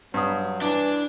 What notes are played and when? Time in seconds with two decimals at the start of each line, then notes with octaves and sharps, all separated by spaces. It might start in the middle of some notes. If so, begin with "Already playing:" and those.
0.14 G2 F#3 D#6
0.62 E3 D4